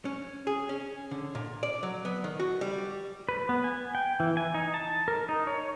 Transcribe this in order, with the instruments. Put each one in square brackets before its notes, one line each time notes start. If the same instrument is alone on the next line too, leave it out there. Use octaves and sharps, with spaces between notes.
[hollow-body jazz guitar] C#4
G#4
C#4
D3
A#2
D5
F#3
B3
D#3
F#4
G3
[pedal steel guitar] B4
B3
G#5
G5
E3
G#5
D#4
A5
A#4
D#4
C#5